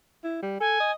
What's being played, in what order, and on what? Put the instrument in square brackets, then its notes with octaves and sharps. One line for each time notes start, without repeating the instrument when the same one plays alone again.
[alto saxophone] E4
G3
[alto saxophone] A4 [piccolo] G#5
[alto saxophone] D#5